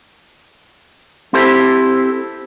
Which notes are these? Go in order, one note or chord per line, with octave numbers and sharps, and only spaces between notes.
C4 E4 G4 A4 C5